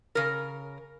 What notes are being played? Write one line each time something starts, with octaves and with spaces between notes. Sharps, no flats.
C#3 A#4